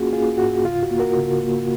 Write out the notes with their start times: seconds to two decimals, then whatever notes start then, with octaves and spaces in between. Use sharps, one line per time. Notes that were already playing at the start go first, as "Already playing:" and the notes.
Already playing: A#3 C#4 F4 F#4 G#4
0.12 A#3 F4 G#4
0.38 G#2 F#4
0.64 C#3 F4
0.83 F#4
0.91 A#3
1.00 F#4 A#4
1.17 C#3
1.43 A#3